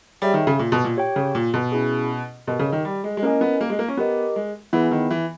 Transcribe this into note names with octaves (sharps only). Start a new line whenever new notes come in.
G3 G#4 C#5 E5 G5
D#3
C#3
A#2
B2
A#2
G4 C#5 G5
C#3
A#2
B2
C#4 E4 G#4
B2 G4 A#4 D#5
C#3
D#3
G3
G#3
G#3
A#3 C#4 E4 A#4 D#5 G#5
B3
A#3
G#3
A#3
C#4
B3 G4 A#4 D#5
G#3
E3 B3 E4 G#4 B4
D#3
E3